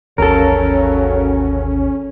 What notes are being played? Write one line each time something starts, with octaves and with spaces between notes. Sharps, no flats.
G#1 D#2 C#3 E3 F#3 C#4 A4 A#4